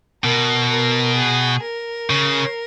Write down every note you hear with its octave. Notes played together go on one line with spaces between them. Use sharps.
B2 A#4
A#4
G#4
A#4
C#3